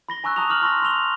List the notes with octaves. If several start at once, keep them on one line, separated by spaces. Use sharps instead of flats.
B5 A#6 G7
G#5 A#5 C#6 E6 F#6
A5 A#5 D#6 E6 F7
D6 F6 F#7
A5 C6 C#6 E6 A#6
C6 E6 F7 G7